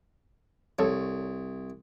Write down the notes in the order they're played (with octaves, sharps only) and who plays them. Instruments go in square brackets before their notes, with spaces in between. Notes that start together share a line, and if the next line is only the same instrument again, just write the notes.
[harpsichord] C2 [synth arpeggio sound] A4 C#5